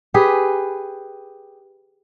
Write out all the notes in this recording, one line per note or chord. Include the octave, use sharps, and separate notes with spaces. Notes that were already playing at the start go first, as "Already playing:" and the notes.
G4 G#4 B4